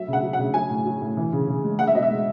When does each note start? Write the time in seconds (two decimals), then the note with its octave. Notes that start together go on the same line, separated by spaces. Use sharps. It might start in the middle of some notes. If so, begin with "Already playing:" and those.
Already playing: F#3 E5
0.08 C#3 F#5
0.23 F#3
0.33 F#5
0.39 C#3
0.54 F#3 G#5
0.69 A2
0.85 F#3
1.01 A2
1.17 E3
1.33 C#3
1.48 C#3
1.64 G#3
1.79 G#3 F#5
1.87 E5
1.94 B2 D#5
2.03 E5
2.11 G#3